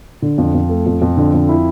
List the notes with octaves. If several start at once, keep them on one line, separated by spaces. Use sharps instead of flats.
D3
F2
F2
A3
F2
F2
D3
F2
E4